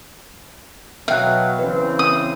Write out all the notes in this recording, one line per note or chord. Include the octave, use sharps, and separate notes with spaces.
B2 F#3 E5 F5 G5 F#6
C#3 E3 C4 B4
D#6